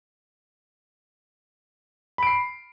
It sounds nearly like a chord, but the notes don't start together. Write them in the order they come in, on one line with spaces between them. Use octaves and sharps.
B5 D7 C7